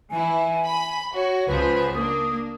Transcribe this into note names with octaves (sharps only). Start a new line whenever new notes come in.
E3 E4 G#5
B5
F#4 C#5
C#2 F3 G#4 B4
A#3 D4 D#6